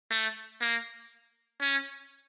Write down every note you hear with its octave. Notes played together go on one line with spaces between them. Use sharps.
A3
A#3
C#4